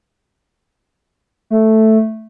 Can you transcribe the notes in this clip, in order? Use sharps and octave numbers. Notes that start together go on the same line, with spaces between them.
A3